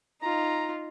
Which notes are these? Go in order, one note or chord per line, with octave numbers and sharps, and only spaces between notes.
D#4 F4 A#5